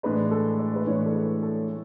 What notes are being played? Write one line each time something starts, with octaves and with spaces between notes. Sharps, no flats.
A2 E3 G#3 D4 B4
A4
D5
B4
A2 E3 G#3 D4 C#5
A4
B4
A4